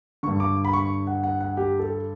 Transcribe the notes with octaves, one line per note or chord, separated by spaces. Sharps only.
G2 D3 C#6
D6
B5
C#6
F#5
F#5
F#5
G4
A4